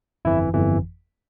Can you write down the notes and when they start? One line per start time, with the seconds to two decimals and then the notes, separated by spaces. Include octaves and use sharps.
0.25 G1 F2 E3 E4
0.54 G1 F2 E3